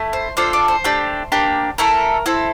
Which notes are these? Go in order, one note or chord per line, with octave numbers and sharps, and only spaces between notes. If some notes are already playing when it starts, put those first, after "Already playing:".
Already playing: A3 E4
C5
D4 F4 A4 C5
D5
C5
A3 D4 G4
A#3 D4 G4
A3 E4 A4 A#4
C4 E4 A4